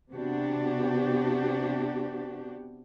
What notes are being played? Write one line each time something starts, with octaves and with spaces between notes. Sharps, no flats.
C3 B3 D4 F#4 G4